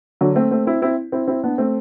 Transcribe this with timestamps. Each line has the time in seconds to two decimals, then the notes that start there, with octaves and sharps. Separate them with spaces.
0.21 D3 F#3
0.36 A3 C4
0.51 A3 C4
0.66 C4 E4
0.82 C4 E4
1.12 C4 E4
1.27 C4 E4
1.43 B3 D4
1.58 A3 C4